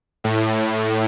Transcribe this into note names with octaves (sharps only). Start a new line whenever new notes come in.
A2